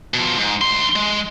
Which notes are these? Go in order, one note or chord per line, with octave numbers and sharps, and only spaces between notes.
B2 F3
G#2
D2 C6
G#3